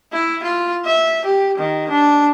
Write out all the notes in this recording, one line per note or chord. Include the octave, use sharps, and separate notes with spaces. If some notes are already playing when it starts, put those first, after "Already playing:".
E4
F4
E5
G4
D#3
D4